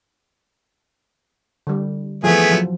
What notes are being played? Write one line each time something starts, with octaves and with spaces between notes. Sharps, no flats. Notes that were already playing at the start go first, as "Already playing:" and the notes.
D3 G3
E3 F3 A3 B3 G#4
F3 F#3